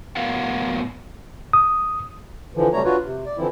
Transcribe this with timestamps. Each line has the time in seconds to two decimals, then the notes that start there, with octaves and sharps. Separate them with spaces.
0.16 A2 F#3 B3 A#4 F5 F#5
1.53 D#6
2.55 D3 E3 F3
2.73 C3 F#3 G3 A3 C#5 A#5
2.84 D4 F4 F#4 B4 C#5
3.03 C3
3.26 D5
3.38 D3 E3 F3 C4 E4